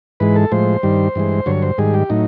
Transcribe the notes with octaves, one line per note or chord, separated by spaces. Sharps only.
G#2 E3 G#3 B4
A4
A2 F3 G#3 C5
G2 D#3 G3
G2 E3 G#3
G2 D3 F#3 C#5
C5
G#2 D#3 G3 G#4
G4
A2 F#3 D#4